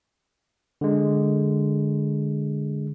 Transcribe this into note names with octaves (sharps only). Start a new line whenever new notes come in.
D3 G#3